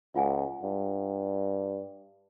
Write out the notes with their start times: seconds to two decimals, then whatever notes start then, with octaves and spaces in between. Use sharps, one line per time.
0.15 C#2 F4 F#5 G#5
0.63 G2